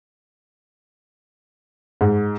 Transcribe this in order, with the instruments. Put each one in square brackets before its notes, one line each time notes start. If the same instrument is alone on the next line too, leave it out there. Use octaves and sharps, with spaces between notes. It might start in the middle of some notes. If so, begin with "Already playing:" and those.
[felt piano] G#2